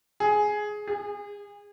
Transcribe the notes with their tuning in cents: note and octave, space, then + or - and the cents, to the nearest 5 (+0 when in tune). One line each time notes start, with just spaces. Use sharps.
G#4 +10
G#4 -30